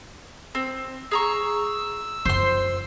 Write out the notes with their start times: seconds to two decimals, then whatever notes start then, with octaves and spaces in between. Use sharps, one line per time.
0.55 C4
1.11 G#4 A#5 C#6 E6
2.25 F#2 F4 C5 C6